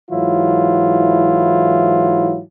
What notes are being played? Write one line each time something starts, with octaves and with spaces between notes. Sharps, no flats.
G#2 E3 F#3 E4 F4